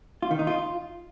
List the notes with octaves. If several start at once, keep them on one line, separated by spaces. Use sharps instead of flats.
F4
D#3
D#4
F4